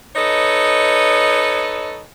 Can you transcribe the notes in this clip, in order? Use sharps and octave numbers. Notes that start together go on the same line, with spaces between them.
D#4 A4 B4 C#5 D#5